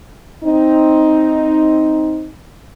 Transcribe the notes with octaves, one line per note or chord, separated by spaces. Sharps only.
C4 D#4